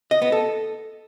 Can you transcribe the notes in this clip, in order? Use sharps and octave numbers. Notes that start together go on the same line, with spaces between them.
D#5
B3
A4